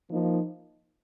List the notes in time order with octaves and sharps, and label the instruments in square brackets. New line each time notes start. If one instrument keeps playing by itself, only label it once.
[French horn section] F3 A#3 D#4